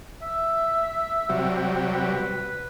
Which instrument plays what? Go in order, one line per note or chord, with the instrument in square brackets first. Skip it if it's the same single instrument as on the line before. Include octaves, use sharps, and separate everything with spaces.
[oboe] E5
[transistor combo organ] C3 F#3 G3
[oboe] B4